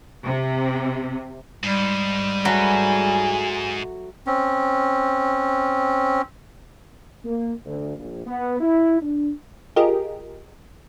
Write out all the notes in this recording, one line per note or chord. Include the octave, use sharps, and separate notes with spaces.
C3
G#2 G3
F#3 A3 G#4 B4 G#5
C4 C#4
A#3
D2
A#1
B3
E4
D4
F4 G4 G#4 A#4 D#5